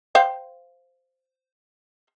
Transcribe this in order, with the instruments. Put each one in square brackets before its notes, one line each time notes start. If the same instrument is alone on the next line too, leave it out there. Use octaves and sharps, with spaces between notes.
[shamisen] C5 F5 G5